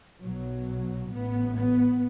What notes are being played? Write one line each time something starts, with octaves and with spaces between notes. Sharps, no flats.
B1 B2 F#3
A1 A2 B3
B3